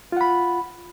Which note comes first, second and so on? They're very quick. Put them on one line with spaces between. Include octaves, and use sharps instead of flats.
F4 F#5 B5